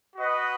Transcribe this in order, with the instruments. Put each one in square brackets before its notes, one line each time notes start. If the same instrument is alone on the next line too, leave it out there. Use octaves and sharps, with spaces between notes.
[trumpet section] F#4 B4 D#5 F#5